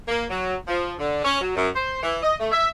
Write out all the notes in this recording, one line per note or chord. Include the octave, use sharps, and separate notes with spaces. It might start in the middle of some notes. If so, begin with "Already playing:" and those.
A#3
F#3
F3
D3
C#4
F#3
F#2
C5
E3
D#5
A3
E5